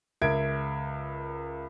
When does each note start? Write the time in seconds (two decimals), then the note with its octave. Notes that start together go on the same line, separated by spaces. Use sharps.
0.21 C#2 A#4 E5 G#6 D7